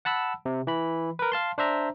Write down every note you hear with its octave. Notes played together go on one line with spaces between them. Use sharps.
F#5 A5 B5 E6
C3
E3 B5
A#4 B4
F5 A5 C6
D4 C5 E5 A#5